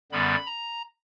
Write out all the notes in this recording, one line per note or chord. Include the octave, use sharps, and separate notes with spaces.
F#2 D3 G3 B3 B5
A#5